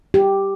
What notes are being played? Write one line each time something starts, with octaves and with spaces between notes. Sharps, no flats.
G4